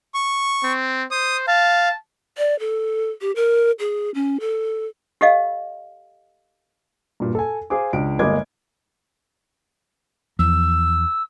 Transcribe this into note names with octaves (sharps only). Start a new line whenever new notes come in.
C#6
C4
C5 D#6
F5 A5
D5
A4
G4
A#4
G#4
C#4
A4
G4 A4 D#5 F5
G2 A#2
A4 G#5
G#4 C5 F5 G#5 D6
C#2 D4 D7
G1 G#3 A#3 D#5 D6 G#6
E2 F3 E6